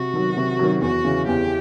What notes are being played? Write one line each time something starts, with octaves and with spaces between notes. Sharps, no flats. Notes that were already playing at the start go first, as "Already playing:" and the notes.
Already playing: C3 F#4
D#3 F#3
C3
D#3 F#3
E2 F#4
C#3 E3
E2 G4